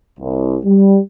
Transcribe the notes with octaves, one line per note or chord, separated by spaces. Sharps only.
C2
G3